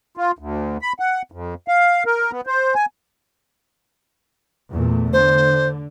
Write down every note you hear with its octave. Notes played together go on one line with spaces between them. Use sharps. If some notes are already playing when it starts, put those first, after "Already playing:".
F4
D2
B5
F#5
F2
F5
A#4
B3
C5
G#5
E2 A#2 A3
D3 C5